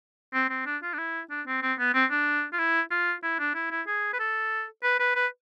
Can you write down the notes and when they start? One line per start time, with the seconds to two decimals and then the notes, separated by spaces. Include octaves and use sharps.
0.34 C4
0.50 C4
0.66 D4
0.82 F4
0.93 D4
0.98 E4
1.30 D4
1.47 C4
1.62 C4
1.79 B3
1.94 C4
2.10 D4
2.53 F4
2.59 E4
2.91 F4
3.23 E4
3.39 D4
3.55 E4
3.71 E4
3.87 G#4
4.13 B4
4.19 A4
4.83 B4
4.99 B4
5.15 B4